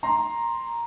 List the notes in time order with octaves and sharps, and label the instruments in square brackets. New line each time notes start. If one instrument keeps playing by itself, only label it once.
[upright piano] A#5 C6